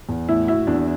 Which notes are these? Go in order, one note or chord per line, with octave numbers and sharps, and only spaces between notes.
E2
A2 E4
E4 F#4
E2 D4